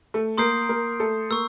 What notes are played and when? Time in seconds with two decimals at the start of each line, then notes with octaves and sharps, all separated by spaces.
0.14 A3 A4
0.38 A#3 A#4 C6 D#6 G6 C7
0.69 A#3 A#4
1.00 A3 A4
1.30 A#3 A#4 C#6 E6